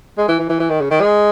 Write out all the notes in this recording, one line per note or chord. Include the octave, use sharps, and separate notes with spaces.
G#3
E3
E3
E3
E3
D#3
C#3
D#3
G#3